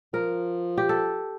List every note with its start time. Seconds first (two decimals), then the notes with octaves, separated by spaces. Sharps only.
0.13 F3 A#4
0.78 G4
0.89 A4